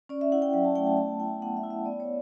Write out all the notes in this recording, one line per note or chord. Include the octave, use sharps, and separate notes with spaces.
C#4 D5
E5
E4 F#5
G5
F#3 G5
A5
A3 G5
A5
B3 A5
E4 G5
B3 F#5
E5
E4
E5
B3 D5
C#5